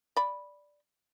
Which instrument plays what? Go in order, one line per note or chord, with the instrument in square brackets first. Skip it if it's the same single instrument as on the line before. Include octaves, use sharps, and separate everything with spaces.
[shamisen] D5 B5